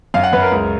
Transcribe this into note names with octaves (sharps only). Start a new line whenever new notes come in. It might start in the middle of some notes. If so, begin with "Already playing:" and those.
F#2 F5
F#5
F#2 B4
A#4
C#2